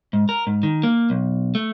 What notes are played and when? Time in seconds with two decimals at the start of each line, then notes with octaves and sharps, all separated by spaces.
0.13 G#2
0.29 A#4
0.47 G#2
0.63 D#3
0.83 A#3
1.10 B1
1.55 A3